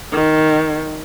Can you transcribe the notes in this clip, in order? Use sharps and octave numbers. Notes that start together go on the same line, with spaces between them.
D#3